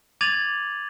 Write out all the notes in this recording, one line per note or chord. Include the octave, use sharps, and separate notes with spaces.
D6 G#6 A6 D#7 F7 F#7